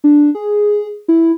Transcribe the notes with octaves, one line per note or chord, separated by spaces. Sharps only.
D4
G#4
E4